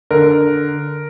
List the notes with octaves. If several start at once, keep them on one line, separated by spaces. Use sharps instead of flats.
D3 A#4